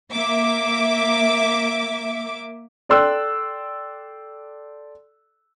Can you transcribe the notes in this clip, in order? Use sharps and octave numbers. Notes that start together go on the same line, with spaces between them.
A#3 E5 D6
A4 D5 G5 C6 E6 F#6